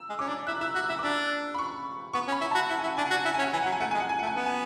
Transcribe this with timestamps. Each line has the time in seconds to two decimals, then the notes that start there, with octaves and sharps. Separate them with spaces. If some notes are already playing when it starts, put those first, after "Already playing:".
Already playing: E6
0.10 G#3
0.19 C#4 D6
0.28 D4
0.47 E4 F#6
0.61 E4 E6
0.74 F#4 F#6
0.89 E4 F#6
0.99 D6
1.03 D4 E6
1.54 B5
1.58 C#6
2.13 B3 C#6
2.28 C#4
2.32 B5
2.41 E4
2.51 F#4 A5
2.69 E4 F#5
2.79 G#5
2.83 E4
2.87 F#5
2.97 D4 G#5
3.07 F#4 F#5
3.17 G#5
3.25 E4 F#5
3.34 G#5
3.39 C#4
3.44 F#5
3.53 E3 G#5
3.63 F#3 F#5
3.72 G#5
3.80 A3 F#5
3.91 G#3 G#5
4.00 F#5
4.09 G#5
4.19 A3 F#5
4.27 G#5
4.36 B3 F#5
4.46 G#5